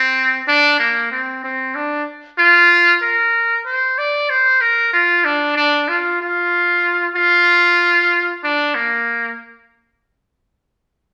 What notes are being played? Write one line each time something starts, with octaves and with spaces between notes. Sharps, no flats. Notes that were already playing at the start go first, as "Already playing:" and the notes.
Already playing: C4
D4
A#3
C4
C4
D4
F4
A#4
C5
D5
C5
A#4
F4
D4
D4
F4
F4
F4
D4
A#3